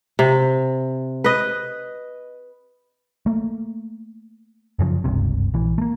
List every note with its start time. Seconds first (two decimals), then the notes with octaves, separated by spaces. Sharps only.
0.19 C3
1.24 B4 D#5
3.26 A3 A#3
4.79 F#2 C#3 F3
5.04 F#1 C#2 G2 C3
5.54 A#1 E3
5.78 A3 A#3